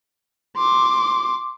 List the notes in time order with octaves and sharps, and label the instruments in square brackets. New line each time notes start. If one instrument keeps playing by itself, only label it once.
[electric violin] C6 D6